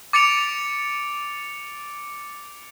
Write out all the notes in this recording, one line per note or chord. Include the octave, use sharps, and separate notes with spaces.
D6 A6 C#7 D7 F7